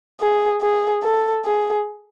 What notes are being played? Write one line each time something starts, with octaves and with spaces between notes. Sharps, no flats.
G#4
G#4
A4
G#4